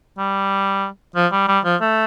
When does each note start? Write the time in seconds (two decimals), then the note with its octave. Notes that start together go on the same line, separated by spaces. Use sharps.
0.18 G3
1.15 F3
1.32 G3
1.48 G3
1.65 F3
1.81 A3